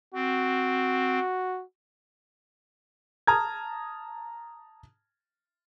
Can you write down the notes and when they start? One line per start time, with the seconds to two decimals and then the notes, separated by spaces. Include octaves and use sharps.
0.14 C4 F#4
3.27 A5 A#5 D#6 F6 G#6